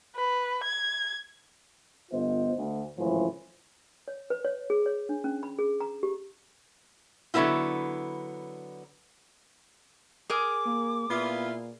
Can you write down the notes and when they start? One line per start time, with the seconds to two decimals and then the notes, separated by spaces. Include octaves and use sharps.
0.16 B4
0.64 G#6
2.12 G1 B3 F4 C5 D#5
2.57 D2
2.97 G#1 C#2 A2 E3 F3
4.08 C#5
4.30 B4
4.44 C#5
4.70 G#4
4.86 C#5
5.09 D4
5.24 C#4
5.43 B5
5.59 G#4
5.80 A#5
6.03 G4
7.34 D3 F#3 A#3 B3 E4 F4
10.30 G#4 A#4 G#5 D6
10.66 A#3
11.09 A#2 B3 E4 F4